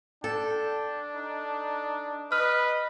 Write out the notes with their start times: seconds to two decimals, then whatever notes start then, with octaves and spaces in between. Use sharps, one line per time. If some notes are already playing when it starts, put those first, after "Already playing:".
0.24 D4 A4 G5
1.15 D#4
2.32 B4 D#5 F6